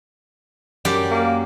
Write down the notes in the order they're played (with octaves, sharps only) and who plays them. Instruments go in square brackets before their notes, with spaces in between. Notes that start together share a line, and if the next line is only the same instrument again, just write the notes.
[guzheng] F#2 G4 D5
[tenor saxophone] A#3